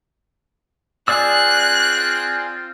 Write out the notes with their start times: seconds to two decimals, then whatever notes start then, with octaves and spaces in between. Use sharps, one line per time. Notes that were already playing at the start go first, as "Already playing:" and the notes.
1.08 C4 F4 G#4 D5 E6 F#6